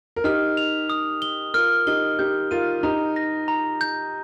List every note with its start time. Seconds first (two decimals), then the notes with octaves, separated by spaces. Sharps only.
0.16 A#4
0.24 D#4 G4 F6
0.57 F7
0.90 D#6
1.22 G7
1.54 F4 A#4 F6
1.87 D#4 G4 G7
2.19 D#4 G4 G6
2.51 F4 A#4 D#7
2.83 D#4 G4 A#5
3.16 A#6
3.48 A#5
3.81 G6